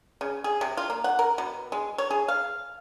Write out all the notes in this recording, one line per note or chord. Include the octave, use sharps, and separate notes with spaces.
C#3
G#4
C3
F4
A#3
F#5
A#4
B2
G#3
C#5
G#4
F5